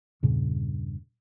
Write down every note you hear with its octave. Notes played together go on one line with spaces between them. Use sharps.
E2 G2 A#2 C#3